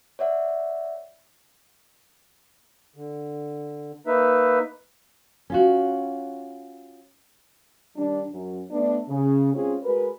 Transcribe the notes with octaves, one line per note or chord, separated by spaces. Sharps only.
C#5 D5 E5 F#5
D3
A#3 D#4 B4 E5
C#4 F4 F#4
D#3 G3 D4
F#2
A3 B3 D4
C#3
G#3 C4 C#4 F4 G#4
G#3 F#4 A#4 B4